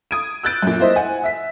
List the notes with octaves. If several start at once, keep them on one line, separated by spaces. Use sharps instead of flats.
D#6 G#6 D7 D#7
E6 F#6 G6 A6 D7
F#2 A#2
A#3 E4 C5 D#5 E5
F#5 G#5
E5 B6